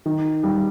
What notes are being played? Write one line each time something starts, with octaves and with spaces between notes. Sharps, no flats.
D#3
G3